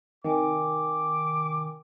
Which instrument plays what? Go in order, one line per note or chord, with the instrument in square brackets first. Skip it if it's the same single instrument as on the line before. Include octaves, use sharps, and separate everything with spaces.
[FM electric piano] C3 D#3 [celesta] A#4 G5 G#5 [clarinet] D6